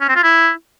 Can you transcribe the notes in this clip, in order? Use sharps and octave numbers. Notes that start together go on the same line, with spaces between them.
C#4
C4
F4
E4